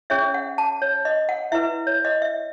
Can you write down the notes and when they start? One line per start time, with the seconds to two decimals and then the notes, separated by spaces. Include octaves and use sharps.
0.10 C#4 G#4 C#5 E5
0.34 F#5
0.58 A5
0.82 C#5
1.05 D#5
1.29 F#5
1.52 E4 B4 E5
1.87 C#5
2.05 D#5
2.22 E5